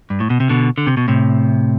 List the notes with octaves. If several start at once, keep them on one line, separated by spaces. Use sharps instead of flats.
G2
A2
B2
C3
B2 D3
D3
C3
B2
A2 C3